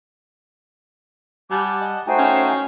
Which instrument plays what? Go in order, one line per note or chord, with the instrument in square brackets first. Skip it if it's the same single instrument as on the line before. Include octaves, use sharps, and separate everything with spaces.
[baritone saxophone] G3 [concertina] F#5 A5 [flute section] G#5 D6
[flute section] D#5
[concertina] A3 D#4 F#4 [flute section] C5 G5 G#5
[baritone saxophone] C#4